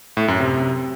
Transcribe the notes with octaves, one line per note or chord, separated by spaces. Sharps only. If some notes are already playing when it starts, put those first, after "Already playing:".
A2
F#2
C3